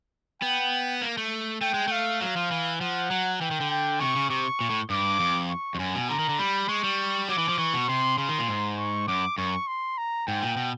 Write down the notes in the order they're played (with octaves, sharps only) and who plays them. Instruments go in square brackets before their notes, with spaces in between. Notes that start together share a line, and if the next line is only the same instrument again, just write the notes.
[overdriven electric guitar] B3 [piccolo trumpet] G5
[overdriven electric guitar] A#3
A3
[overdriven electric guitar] A3 [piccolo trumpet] G5
[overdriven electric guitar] G#3
[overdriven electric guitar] A3 [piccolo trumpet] F5
[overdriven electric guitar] F#3 [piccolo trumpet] F5
[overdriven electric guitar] F3
E3
[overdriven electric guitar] F3 [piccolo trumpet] F#5
[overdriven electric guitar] F#3
[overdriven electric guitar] E3 [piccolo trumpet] G5
[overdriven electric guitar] D#3
D3
[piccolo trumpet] G5
[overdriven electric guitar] C3 [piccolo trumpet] C#6
[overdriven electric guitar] C#3
[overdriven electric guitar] C3 [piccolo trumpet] C#6
[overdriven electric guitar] A#2
A2
[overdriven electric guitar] G2 [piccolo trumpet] D6
[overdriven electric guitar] F2
[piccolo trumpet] C#6
[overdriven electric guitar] F2
[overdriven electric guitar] F#2 [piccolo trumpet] G#5
[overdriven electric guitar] B2
[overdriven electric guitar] D3 [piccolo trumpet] A#5
[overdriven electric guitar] D#3
D3
[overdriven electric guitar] G3 [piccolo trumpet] B5
[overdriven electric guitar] G#3 [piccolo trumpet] C#6
[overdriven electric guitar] G3
[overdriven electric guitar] F#3 [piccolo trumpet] D6
[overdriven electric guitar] E3
F3
[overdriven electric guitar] E3 [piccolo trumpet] C#6
[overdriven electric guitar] B2
[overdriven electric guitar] C3 [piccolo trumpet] C6
[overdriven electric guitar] C#3 [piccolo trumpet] C6
[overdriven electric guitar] D#3
A#2
G#2
[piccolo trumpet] C#6
[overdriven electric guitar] F#2 [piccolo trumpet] D6
[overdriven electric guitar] F#2 [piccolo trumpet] C#6
[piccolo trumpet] C6
A#5
[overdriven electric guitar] G#2 [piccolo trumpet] G5
[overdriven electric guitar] A#2
B2